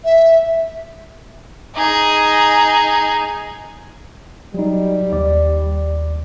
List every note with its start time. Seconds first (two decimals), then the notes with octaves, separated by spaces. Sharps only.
0.05 E5
1.76 D#4 G#4
4.54 F#3 G3 D#4
5.13 D#2 D5